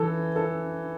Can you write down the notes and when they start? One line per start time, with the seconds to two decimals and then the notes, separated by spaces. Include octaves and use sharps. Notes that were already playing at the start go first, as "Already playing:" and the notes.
Already playing: E3 A4
0.36 A4